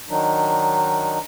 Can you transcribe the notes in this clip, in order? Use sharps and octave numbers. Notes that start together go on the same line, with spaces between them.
D#3 F#3 D4 D#4